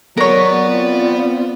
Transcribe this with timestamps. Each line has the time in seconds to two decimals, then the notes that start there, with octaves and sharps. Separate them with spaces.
0.17 F#3 B3 A#4 C#5 D5
0.66 C4 F4